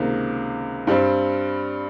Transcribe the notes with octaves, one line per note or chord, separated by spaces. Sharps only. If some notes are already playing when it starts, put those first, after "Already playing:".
Already playing: C#2 C3 D#3 A#3 D#4
G2 G3 C4